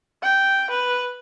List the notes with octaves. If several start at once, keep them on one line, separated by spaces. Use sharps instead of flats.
G5
B4